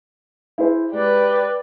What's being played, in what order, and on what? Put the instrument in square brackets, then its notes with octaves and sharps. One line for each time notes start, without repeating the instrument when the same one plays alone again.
[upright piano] E4 G#4 C5
[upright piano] G#3 [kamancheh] G4 B4 [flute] D5